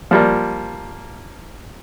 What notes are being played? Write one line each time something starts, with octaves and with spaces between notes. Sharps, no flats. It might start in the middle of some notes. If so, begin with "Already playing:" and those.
F3 G3 A#3